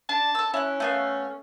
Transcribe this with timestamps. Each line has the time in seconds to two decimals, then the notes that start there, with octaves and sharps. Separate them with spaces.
0.09 D4 A5
0.35 A4 E6
0.54 C#4 E4 F#6
0.80 A3 B3 F5